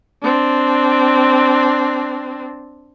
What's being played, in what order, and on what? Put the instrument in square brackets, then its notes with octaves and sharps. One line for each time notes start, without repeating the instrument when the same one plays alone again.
[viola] C4 D4